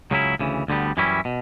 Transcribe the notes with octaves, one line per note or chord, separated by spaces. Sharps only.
C#2 C#3 F#3 C#4 E4
D2 C#3 E3
D2 D3 G3 B3
F#2 E3 G3 C#4 E4
B2